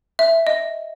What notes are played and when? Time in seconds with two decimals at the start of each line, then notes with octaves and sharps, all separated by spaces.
0.19 E5
0.47 D#5